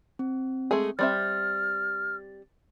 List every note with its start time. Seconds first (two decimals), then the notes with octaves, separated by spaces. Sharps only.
0.19 C4
0.71 G#3 A3 G#4
0.99 G3 C4 E5 F6 A6